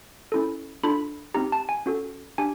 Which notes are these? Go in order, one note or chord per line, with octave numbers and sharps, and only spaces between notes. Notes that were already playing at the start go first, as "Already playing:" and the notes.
C#4 E4 A4
D4 F4 A4 B5
C4 D#4 G4 A#5
A5
G#5
C#4 F#4 A4
D4 G4 G#5